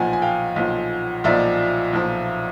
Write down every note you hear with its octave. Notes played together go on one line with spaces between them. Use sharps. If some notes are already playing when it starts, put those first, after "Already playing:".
Already playing: B1 A#2 F3 F#5 G#5
G#5
F5 G5
B1 A#2 F3
B1 A#2 F3 D5 E5
B1 A#2 F3